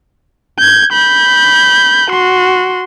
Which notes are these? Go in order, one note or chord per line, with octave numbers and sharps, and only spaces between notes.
G6 G#6
B5 G6
F#4 C6